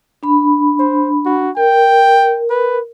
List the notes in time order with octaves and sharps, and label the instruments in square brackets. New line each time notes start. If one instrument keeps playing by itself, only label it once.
[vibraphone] D4 B5
[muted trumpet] C5
F#4
[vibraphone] A#4 [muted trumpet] G5
[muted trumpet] B4